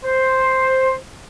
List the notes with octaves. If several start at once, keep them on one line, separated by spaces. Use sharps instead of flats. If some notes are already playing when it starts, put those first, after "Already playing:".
C5